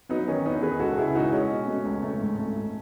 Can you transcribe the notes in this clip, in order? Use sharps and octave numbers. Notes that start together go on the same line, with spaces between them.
F#3 B3 D#4
D#3 C#4
E2 B3 D#4
D#3 G#4 B4
C#2 F#4 A4
C#3 E4 G#4
C#2 D#4 F#4
G#3 C#4
B2
A3
C#2
A3
G#2
A3
A3